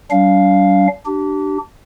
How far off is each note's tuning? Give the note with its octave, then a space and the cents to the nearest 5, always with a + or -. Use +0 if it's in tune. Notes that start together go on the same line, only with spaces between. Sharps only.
G3 -45 D4 -45 F5 -5
D4 +15 G4 -30